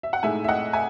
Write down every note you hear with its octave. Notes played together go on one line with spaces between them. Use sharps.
E5
F#5
A2 G#3 D#4 E5 G#5
E5
D#5 F#5
E5 G#5